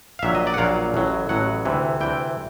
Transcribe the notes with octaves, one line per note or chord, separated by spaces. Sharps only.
F5
A#1 A#2 F#3 E5
D#5
D5
F#5
A#1 A#2 F#3 F5
A1 A2 F#3
A1 A2 F#3 F#5
D2 C3 E3
D2 C3 E3 G5